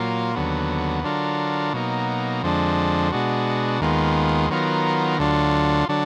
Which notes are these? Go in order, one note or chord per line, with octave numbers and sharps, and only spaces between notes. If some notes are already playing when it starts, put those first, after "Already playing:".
Already playing: A#2 F#3 A#3 F4
D#2 D3 F#3 B3
D3 F#3 D4 F4 A#4
B2 F#3 A#3 D#4
F2 D3 F3 G#3 D4
B2 G#3 D4 F#4
D#2 D#3 G#3 B3 F4
D#3 F#3 B3 F4 A#4
D2 D3 F#3 D4 F4
D3 F#3 D4